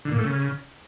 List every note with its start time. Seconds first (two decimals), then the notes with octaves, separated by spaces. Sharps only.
0.05 D3
0.12 A#2
0.18 A3
0.25 C#3